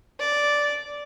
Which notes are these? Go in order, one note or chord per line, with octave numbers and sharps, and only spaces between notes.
D5